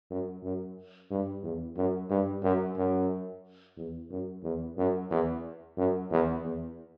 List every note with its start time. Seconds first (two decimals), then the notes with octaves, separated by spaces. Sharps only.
0.10 F#2
0.43 F#2
1.10 G2
1.43 E2
1.77 F#2
2.10 G2
2.43 F#2
2.76 F#2
3.77 E2
4.11 F#2
4.43 E2
4.77 F#2
5.11 E2
5.77 F#2
6.11 E2
6.43 E2